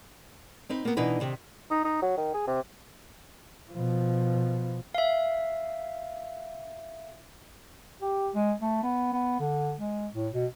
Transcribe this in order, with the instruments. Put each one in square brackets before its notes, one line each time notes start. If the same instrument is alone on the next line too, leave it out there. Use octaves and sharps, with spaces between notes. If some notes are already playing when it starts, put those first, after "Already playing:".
[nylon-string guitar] C4 D#4 B4
A#3 B3
B2 E3 D4 D#4 B4
C3 D#3
[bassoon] D#4
D#4
F#3
D#3
G#4
C3
[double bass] B2 F3
[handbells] E5 F5
[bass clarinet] G4
G#3
A3
B3
B3
D3
G#3
A2
B2